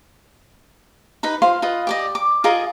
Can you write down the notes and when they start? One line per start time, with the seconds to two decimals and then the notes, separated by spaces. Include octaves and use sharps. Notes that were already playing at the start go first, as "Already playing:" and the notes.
1.23 D#4 B4 B5
1.42 F4 C5 F5 C6
1.62 F4 B4 D#5
1.87 G4 D5 D#5
2.15 D6
2.44 F4 G#4 A#4 D#5